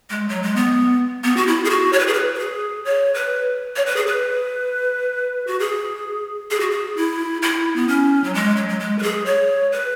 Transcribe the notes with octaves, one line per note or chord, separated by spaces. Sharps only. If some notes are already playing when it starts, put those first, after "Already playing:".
G#3
F#3
G#3
B3
B3
F#4
E4
G#4
F#4
C#5
B4
G#4
B4
B4
G#4
C#5
B4
C#5
B4
G#4
B4
F#4
G#4
G#4
F#4
G#4
E4
E4
B3
C#4
F#3
G#3
F#3
F#3
G#3
B4
G#4
C#5
B4